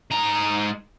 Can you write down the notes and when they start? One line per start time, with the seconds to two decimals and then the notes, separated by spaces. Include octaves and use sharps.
0.11 G#2 A#5